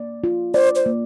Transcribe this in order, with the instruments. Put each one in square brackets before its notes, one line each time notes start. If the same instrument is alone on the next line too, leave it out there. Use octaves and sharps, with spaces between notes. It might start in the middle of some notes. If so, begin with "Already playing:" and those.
Already playing: [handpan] A#3 D5
F4
[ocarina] C5 [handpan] D5
[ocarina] C5
[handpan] A#3